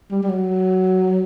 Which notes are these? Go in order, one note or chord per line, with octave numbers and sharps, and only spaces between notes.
G3
G3
F#3